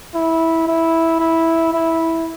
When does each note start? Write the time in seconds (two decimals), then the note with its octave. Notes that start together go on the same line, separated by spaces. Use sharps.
0.14 E4
0.67 E4
1.20 E4
1.73 E4